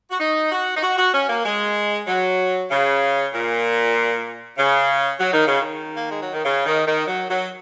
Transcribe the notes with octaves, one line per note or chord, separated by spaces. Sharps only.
F#4
D#4
F#4
D#4
F#4
F#4
C#4
A#3
G#3
F#3
C#3
A#2
C#3
F#3
D#3
C#3
D#3
A#3
G#3
F#3
D#3
C#3
D#3
D#3
F#3
F#3